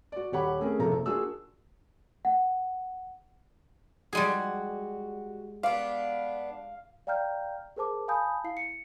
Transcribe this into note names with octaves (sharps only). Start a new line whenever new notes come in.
F#4 D5
D#1 G4 C#5 F#5 B5
A3 C4 C#4 G#4 A#4
F#1 C3 F3 A4 A#5
F#1
A#3 D4 F4 F#4 G#4 E6
F#5
G3 G#3 F#4 G#4
B3 D4 F5
D5 F5 G5 A#5 F6 G6
G#4 A#4 C5 A5 D6
F5 G#5 A5 B5 D#6 G6
E4 F5 C7
C#7